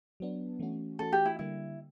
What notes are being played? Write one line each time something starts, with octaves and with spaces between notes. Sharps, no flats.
F#3 B3 D4
E3 A3 C#4 F#4
E3 A3 C#4 F#4 A4
G4
E4
D3 G3 A#3 E4